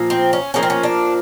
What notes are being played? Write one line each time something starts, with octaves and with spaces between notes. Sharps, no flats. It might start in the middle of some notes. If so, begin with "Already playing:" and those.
Already playing: A#2 F3 A#3
C4
C#4
A#2 F3 A#3 C#4
C4
C#4
D4